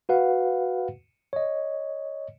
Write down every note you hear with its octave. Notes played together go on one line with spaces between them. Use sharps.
F#4 B4 F5 F#5
C#5 D#5